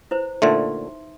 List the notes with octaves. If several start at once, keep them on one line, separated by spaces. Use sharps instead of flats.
E4 B4 C5
A#2 D3 A3 D#4 E5 C6